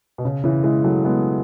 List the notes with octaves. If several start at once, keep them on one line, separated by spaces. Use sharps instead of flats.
B2
C#3
C#3 E3
E3 G#3
F#3 A3
G#3 B3